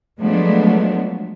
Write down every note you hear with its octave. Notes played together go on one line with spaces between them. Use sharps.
F3 F#3 G#3 A3 B3 D4